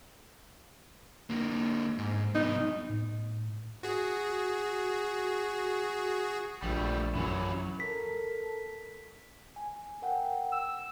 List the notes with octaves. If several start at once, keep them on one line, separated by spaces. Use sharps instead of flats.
D3 A#3
G#2
C2 B3 D#4
A2
F#4 G#4
A#1 G3 A3
F#2 E3 F#3
A4 A#4 B6
G#5
A#4 F#5 G5
E6